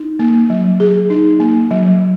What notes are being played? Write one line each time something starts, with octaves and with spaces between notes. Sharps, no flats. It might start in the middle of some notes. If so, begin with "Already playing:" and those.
Already playing: D#4
A#3
F#3
G#4
D#4
A#3
F#3